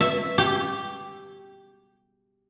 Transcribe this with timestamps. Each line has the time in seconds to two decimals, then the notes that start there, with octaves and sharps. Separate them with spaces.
0.01 E5
0.38 G4